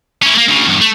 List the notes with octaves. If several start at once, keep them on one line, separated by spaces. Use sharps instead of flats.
C#4 E4
A3 A#3
D2 C#3
E2 G2
A3